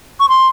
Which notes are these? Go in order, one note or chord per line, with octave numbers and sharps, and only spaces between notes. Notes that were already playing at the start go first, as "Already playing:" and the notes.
C#6
C6